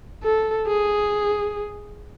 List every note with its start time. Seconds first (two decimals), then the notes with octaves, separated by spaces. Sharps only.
0.24 A4
0.67 G#4